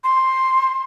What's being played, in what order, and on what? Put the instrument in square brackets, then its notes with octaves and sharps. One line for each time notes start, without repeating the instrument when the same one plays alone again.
[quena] C6